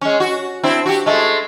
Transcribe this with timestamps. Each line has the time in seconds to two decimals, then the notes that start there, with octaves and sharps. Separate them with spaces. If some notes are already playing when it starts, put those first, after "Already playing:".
0.01 G#3 C#4
0.20 F#4
0.63 C4 D4 E4
0.86 F#4 G4
1.06 G#3 A3